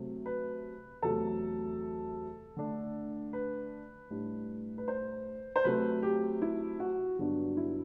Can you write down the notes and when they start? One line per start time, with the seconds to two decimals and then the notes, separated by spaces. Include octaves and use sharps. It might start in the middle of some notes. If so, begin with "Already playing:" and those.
Already playing: C3 F#3 A3 C4
0.26 B4
1.02 E2 C3 F#3 A3 A4
2.57 D3 A3 D4
3.33 B4
4.10 A2 G3 D4
4.78 B4
4.88 C5
5.56 C5
5.64 C3 F#3 A3 C4 B4
6.02 G4
6.42 E4
6.80 F#4
7.19 G2 D3 F#3 B3 D4
7.57 E4